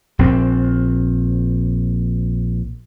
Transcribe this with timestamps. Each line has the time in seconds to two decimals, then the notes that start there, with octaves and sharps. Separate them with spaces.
0.19 A#1 C4